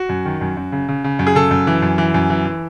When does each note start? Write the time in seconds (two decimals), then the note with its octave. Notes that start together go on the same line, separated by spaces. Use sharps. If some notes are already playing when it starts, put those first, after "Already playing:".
Already playing: F#4
0.09 F#2
0.25 D#3
0.41 F#2
0.57 F#2
0.72 C#3
0.88 C#3
1.04 C#3
1.19 F#2
1.27 G#4
1.35 C#3 A4
1.51 F#2
1.67 E3
1.82 F#2
1.98 E3
2.14 F#2
2.30 E3
2.45 E3